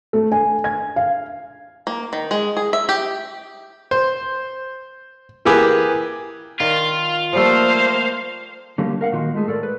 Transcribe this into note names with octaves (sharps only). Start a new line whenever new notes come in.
A3
G#5
G#6
F5
A#3
D#3
G#3
G#4
E5
G4
C5
E3 A#3 G4 G#4 B4
D#3 F4 D5
F3 G3 A3 A#3 C5 F5
D3 F#3 G3 A3 A#3
A#4 F5 F#5
A#2 D#3 A#3 F4 F#4
G#3 A3 G#4
A2 A4 A#4 D5
B4